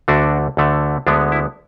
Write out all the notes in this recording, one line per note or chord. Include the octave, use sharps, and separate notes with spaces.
D2 D3 A3 D4 F#4
D2 D3 A3
D2 D3 G#3 B3 D4
E4